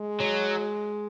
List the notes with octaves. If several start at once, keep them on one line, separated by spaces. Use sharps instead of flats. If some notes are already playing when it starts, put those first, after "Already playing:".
Already playing: G#3
F#3